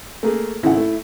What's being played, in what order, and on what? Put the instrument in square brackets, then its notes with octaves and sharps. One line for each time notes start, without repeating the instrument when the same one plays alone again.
[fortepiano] A3 A#3 G#4
[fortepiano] G#1 C#3 F#5 [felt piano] E4
[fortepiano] A3